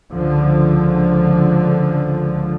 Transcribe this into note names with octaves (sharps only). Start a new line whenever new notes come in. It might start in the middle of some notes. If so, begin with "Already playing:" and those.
C#2 D3 F3